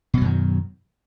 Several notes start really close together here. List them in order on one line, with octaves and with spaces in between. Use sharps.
B2 F#3 F#2 D#3